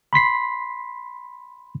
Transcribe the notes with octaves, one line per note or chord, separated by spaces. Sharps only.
B5 C6 B6 C7